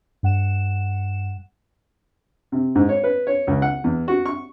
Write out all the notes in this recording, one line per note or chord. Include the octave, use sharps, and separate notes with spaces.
G2 F#5 E7
C3
G#2
C#5
B4
C#5
C#2
F#5
E2
F#4
C#6